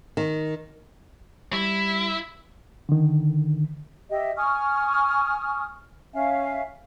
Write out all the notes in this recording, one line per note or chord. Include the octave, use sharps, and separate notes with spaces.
D#3
G3 E4
D3 D#3
G4 D#5 E5
G#5 C#6 D#6 F6
C#4 E5 F5 G#5